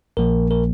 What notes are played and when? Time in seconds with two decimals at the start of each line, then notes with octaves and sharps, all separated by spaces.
0.17 A#1 A#2 F3 A#3 A#4
0.51 A#4